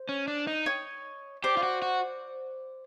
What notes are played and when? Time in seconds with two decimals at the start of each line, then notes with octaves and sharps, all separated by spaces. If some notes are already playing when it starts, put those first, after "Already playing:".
Already playing: C5
0.09 C#4
0.28 D4
0.47 D#4
0.66 C#5 D#5
1.44 G4 C5 D5
1.57 F4
1.63 F#4
1.82 F#4